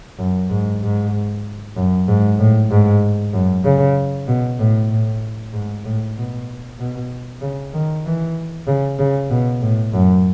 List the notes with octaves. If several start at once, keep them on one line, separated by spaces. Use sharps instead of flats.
F#2
G#2
G#2
F#2
G#2
A2
G#2
F#2
C#3
B2
A2
A2
G#2
A2
B2
B2
C#3
D#3
E3
C#3
C#3
B2
A2
F#2